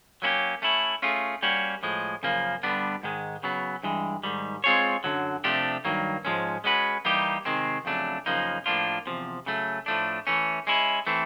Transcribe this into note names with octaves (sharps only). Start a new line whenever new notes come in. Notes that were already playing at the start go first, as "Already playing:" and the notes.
F#3 A#3 C#4 E4 G4
A3 C#4 E4
A3 C#4 F4 G#4
G3 A#3 C#4 F#4
A2 F3 G#3
F#2 C#3 F3 A#3
G2 D3 G3 B3 D4
G#2 D#3 G#3
C#3 F#3 B3
G2 E3 G#3
G#2 D#3 G3
G#3 C4 F4 G#4 C#5
F#2 D3 F#3
C3 F3 A3 D4 G4
G2 D#3 F#3 A#3
G#2 F3 G#3 C#4
G#3 C#4 F#4 B4
E3 G3 A#3 D#4 G4
C3 D#3 G#3 C4
F2 C#3 F#3 A3 D4
F#2 C#3 F3 A#3 D#4
A2 F3 A#3 D4 F4
E2 C3 F3
C#3 F#3 A3
A2 F3 A3 D4
E3 A3 C#4
G#3 C#4 E4
E3 A3 C4